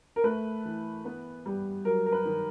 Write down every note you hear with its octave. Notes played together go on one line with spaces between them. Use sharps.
A#4
A3 B4
E3
B3
G3
F#3 A#4
A#4
B4
D#3